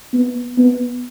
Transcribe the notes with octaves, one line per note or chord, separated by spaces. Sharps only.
B3
B3